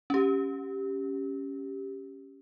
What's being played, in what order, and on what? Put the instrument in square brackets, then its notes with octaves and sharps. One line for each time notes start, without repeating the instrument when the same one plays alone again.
[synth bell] C#4 G4